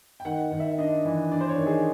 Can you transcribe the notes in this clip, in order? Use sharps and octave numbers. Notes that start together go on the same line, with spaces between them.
G5
D#3 F#5
D#3
E5
D4 D#5
E3
D4 D5
C5
C#5
D#3
G#4